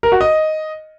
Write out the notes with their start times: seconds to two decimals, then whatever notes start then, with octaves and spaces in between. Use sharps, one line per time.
0.03 A#4
0.12 F#4
0.21 D#5